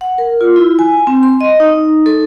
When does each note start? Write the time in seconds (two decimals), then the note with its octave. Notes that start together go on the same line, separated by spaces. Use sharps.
0.01 F#5
0.18 A#4
0.41 F4
0.56 E4
0.79 G#5
1.07 C4
1.23 C6
1.41 D#5
1.60 D#4
2.06 A4